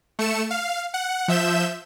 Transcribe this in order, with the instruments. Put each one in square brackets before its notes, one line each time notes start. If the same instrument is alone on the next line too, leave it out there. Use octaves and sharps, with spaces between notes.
[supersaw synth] A3 C#7 E7
F5
F#5
F3 E5 G6 E7